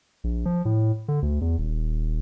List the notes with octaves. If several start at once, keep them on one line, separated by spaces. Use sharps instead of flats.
A#1
F3
A2
D3
D2
E2
D#1